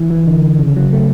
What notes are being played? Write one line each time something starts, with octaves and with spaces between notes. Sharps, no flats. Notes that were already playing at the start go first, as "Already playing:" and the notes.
Already playing: E3
E3
D3
C#3
F#3
A3